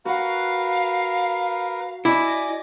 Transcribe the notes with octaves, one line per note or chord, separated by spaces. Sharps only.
F#4 A#4 B4 F5 F#5
E4 D5 D#5 G#5 D6